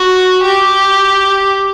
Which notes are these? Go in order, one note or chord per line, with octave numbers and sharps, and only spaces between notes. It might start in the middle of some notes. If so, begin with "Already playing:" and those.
Already playing: F#4
G4